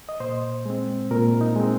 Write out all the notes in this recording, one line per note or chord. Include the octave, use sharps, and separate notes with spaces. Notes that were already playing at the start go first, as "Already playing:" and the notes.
D#5
A#2 C5
G#3 C4
A#2 A#4
D#4
G#3 C4